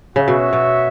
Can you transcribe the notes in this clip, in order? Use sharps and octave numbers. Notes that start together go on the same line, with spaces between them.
C#3 F#4 C#5 E5
B2
B2